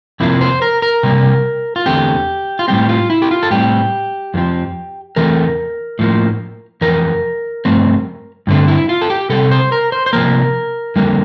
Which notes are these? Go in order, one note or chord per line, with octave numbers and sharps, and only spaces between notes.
F2 C3 F3 A#3 E4
C5
A#4
A#4
C3 G3 A#3
F4
E2 D3 A3 C4 G4
F4
A2 G3 C4 G4
F4
E4
G4
F4
A4
A2 G3 C4 G4
F2 D3 F3 C4
E2 E3 A3 C4 A#4
A2 F3 A#3
F2 E3 A#4
G2 F3 A3 C4
G2 D3 A3 C4
E4
F4
A4
G4
C3 G3 C4 A4
C5
A#4
C5
C5
C3 F3 A#3 A#4
F2 D3 G3 A#3